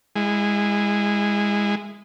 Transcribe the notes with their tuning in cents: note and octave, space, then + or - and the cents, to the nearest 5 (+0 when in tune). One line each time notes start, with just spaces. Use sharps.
G#3 -20 E4 +0